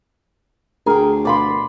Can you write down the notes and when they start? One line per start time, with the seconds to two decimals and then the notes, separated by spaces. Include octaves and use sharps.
0.86 D2 G#4 A#4 G5
1.25 B2 F3 D5 B5 C6